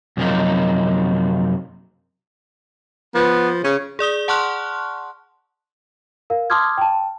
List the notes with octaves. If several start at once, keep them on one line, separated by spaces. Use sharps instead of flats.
F#2 C3 F3 F#3 A#3 D#4
F3 B3
C#3 C#4
G#4 D5 D#6 G7
F#5 A5 C6 C#6 F6 F#6
A#4 F5
A5 C6 D6 D#6 F6 G#6
G5 A5